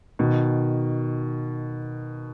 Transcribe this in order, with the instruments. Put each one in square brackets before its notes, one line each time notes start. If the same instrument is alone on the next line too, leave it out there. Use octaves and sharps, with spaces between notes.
[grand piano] B2 D#3